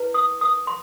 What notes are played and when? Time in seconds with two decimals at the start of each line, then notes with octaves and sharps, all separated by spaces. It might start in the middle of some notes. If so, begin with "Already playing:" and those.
Already playing: E4 B4
0.14 D#6
0.41 D#6
0.67 C6